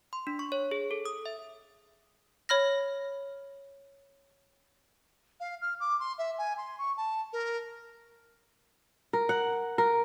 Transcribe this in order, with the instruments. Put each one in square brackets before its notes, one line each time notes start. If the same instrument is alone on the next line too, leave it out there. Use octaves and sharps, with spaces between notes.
[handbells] C6
D4
C#6
C#5
G#4
A4
D#6
E5
[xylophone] C#5 B5 F6 A#6
[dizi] F5
F6
D6
C6
E5
G#5
C6
C#6
A5
A#4
[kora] A#4
F#5
A#4